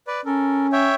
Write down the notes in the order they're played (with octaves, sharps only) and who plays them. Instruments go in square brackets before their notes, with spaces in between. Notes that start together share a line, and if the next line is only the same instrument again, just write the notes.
[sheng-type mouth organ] B4 D5
[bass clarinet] C#4 [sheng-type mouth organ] A4 A#4
[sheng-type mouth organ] C#5 E5 G5